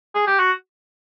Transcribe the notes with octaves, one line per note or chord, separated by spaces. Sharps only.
G#4
G4
F#4